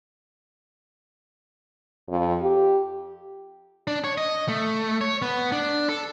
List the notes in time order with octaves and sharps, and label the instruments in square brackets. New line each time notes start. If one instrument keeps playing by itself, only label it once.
[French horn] F2
G4
[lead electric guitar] D4
C#5
D#5
A3
C#5
B3
D4
A4